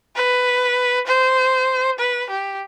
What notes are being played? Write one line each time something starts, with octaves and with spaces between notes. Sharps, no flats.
B4
C5
B4
G4